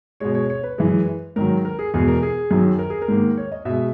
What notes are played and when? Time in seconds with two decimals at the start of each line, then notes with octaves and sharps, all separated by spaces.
0.20 B2 G#3 C#5
0.35 C#5
0.50 C#5
0.63 B4
0.78 F#2 E3 G#3
1.36 G#2 D#3 F#3 A#4
1.65 A#4
1.79 G#4
1.94 E2 B2 G#3 G#4
2.08 A#4
2.23 G#4
2.51 F#2 D#3 F#3
2.79 A#4
2.90 G#4
3.02 A#4
3.08 G#2 D#3 A#3
3.37 C#5
3.52 D#5
3.65 B2 G#3 E5